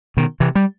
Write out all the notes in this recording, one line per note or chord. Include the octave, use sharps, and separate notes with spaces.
B2 D#3
C3 E3
G3